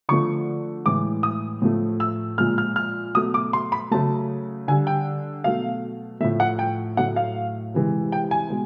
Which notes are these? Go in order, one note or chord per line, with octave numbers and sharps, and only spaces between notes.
D3 F3 A3 C#6
A2 E3 G#3 D6
D#6
A2 F3 A3
E6
A#2 F3 G#3 F6
F6
F6
B2 F#3 A3 D#6
D6
C6
B5
C#3 F#3 A3 A5
D3 G3 G#5
G5
B2 F#3 A3 F5
A2 F3 A3 E5
F#5
G5
A2 F#3 A3 F#5
F5
C3 E3 G#3
G5
G#5
B2 G#3